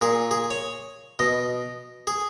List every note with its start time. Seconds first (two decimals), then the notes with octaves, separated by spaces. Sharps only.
0.01 A#2 G#4
0.31 G#4
0.50 C#5
1.19 B2 D#5
2.07 G#4